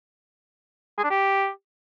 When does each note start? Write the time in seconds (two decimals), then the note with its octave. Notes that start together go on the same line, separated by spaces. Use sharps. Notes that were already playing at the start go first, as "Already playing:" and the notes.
0.98 G#4
1.04 D4
1.10 G4